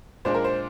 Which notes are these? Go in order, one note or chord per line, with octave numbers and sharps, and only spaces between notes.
A#2 G#3 D4 C5
A#4
C5